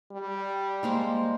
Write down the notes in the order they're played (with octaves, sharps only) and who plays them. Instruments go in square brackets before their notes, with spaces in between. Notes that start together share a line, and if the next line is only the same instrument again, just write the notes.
[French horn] G3
[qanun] G#3 A#3 C5